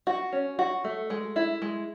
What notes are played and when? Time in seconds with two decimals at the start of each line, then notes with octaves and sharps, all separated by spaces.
0.07 F#4
0.33 C#4
0.59 F#4
0.84 A3
1.10 G#3
1.36 E4
1.62 G#3